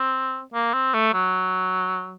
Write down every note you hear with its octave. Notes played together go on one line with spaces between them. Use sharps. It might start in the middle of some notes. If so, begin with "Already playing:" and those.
Already playing: C4
A#3
C4
A3
F#3